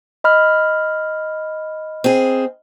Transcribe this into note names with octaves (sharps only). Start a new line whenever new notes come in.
D#5 B5 F6
C4 G#4